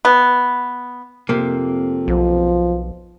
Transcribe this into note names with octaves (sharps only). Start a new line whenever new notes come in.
B3
F2 C3 A#3
B1 F3